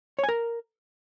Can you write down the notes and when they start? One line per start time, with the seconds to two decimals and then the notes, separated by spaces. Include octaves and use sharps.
0.19 C#5
0.24 G#5
0.29 A#4